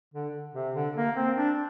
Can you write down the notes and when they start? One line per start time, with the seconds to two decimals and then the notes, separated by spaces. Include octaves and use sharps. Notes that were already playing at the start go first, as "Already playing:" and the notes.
0.14 D3
0.54 C3
0.74 D3
0.96 A#3
1.16 C4
1.36 D4